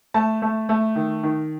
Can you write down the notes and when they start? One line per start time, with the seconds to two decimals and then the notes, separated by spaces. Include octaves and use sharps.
0.14 A3 A5
0.42 A3
0.69 A3
0.96 D#3
1.23 D#3